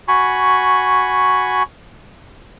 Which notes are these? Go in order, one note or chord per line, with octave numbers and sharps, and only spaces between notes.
F#4 G#5 B5 C#6